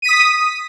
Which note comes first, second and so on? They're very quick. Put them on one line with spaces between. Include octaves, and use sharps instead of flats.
D#7 B6 D#6